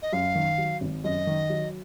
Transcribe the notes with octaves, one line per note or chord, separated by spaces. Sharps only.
D#5
F#2 F5
D#3
F#3
G#1
F#2 D#5
D#3
F#3